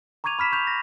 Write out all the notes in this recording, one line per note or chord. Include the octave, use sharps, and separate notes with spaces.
A#5 C#6 D6 G#6 D#7 F7
B5 F6 B6 E7
C#6 G6 F7
A#6